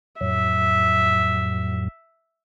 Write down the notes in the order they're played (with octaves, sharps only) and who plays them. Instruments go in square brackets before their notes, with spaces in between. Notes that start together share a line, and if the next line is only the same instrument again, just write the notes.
[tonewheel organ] F2 A2 F#3 [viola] E5